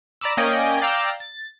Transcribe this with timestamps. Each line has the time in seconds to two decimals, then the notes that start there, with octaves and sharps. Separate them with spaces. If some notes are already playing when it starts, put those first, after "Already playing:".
0.21 D5 A#5 B5 D6 E6
0.37 A#3 C#4 D5 D#5 G5 G#5
0.82 D5 F5 G5 A#5 E6
1.20 A6